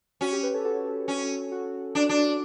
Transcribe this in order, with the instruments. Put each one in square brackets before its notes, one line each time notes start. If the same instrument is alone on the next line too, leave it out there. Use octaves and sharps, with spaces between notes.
[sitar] C#4 [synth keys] F#4
[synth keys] G4
G4 B4
A4 C#5
F#4 A4
[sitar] C#4
[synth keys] F#4
[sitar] D4
D4